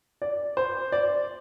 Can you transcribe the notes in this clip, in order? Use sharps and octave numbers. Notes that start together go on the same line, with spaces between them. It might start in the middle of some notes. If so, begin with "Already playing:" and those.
D5
C5
D5